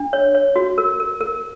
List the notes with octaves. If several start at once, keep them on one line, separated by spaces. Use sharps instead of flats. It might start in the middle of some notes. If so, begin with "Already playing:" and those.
Already playing: D4
C#5
C#5
F#4
A#4
A#4
A#4